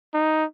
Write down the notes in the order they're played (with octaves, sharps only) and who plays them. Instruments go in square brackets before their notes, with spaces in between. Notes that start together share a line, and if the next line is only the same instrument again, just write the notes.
[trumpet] D#4